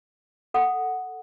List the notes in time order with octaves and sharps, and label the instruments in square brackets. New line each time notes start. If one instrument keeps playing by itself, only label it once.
[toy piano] A4 F#5